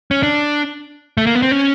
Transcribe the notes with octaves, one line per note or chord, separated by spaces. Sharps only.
C#4
D4
A3
A#3
B3
C4
C#4